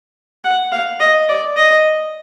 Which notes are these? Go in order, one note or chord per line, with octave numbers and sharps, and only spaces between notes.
F#5
F5
D#5
D5
D#5